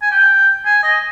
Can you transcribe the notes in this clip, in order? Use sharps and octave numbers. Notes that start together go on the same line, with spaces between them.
G#5
G5
G#5
D#5